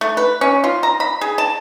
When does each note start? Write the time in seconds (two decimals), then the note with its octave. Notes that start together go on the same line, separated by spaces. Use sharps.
0.01 A3
0.17 B4
0.41 C#4
0.64 F4
0.83 A#5
1.00 B5
1.21 G#4
1.38 A5